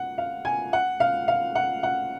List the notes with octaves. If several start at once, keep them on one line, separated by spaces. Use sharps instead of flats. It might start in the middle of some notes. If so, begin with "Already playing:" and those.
Already playing: F#5
F5
G#5
F#5
F5
F5
F#5
F#5